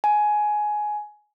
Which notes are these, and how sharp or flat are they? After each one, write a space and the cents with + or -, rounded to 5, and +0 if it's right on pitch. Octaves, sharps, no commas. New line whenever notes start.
G#5 +15